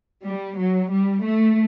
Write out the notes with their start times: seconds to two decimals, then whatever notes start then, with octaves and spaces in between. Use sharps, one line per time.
0.25 G3
0.58 F#3
0.91 G3
1.24 A3